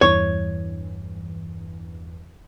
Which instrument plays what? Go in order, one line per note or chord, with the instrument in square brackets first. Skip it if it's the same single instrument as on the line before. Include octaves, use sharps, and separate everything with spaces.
[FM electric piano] E2 G2 E3 [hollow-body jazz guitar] C#5